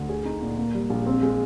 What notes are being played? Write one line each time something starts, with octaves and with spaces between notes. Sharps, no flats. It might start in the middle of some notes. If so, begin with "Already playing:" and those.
Already playing: D2
G#4
D#4
A#2
A#3
G3
A#1
C4
G#3